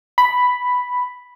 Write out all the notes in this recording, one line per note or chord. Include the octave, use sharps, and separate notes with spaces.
B5